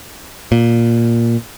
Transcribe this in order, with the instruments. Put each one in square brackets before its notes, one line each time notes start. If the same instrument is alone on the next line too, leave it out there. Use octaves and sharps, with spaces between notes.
[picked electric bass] A#2